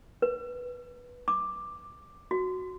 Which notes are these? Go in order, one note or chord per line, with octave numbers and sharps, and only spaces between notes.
B4
D6
F#4